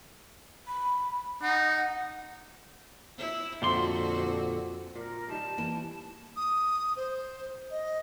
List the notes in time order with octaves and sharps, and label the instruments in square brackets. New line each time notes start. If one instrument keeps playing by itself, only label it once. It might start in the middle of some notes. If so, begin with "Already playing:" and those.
[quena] B5
[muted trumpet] D#4 [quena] F#5
[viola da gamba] E4
[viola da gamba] F2 F#4 [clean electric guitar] A#2 D3 C6
[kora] A#2 [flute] A#4
[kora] C3 D#3 G3 [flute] A5
[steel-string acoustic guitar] E3 [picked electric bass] A#3
[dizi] D#6
C5
D#5